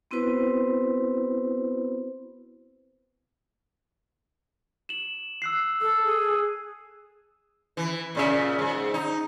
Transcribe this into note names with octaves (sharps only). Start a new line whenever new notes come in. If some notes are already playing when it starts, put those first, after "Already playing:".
B3 C4 E4 F#4 B4 C5
E7 F#7
E6 F#6 C7
A4 E6
G#4
E3
A#2 C#3 E5
G#2
D#4